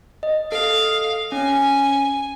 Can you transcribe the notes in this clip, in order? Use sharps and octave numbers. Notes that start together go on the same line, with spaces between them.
D#5
A4 F5
C#4 G#5